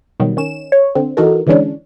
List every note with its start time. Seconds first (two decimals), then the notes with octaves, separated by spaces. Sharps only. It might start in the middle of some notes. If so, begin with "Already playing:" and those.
0.20 B2 D#3 F#3 G3
0.37 D#3 C#4 E7
0.72 C#5
0.95 D3 C4
1.17 E3 D#4 F#4 A4 A#4
1.47 D3 E3 G#3 C#4 D4